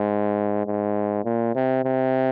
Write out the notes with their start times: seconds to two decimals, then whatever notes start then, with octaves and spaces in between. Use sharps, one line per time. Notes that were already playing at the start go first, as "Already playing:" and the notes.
Already playing: G#2
0.67 G#2
1.25 A#2
1.55 C3
1.85 C3